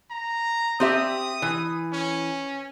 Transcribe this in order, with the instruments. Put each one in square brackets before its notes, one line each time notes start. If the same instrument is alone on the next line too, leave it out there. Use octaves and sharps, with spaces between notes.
[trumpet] A#5
[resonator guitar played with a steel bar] C4 G4 E5 [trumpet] D#6
[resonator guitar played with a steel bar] E3
[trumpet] C#4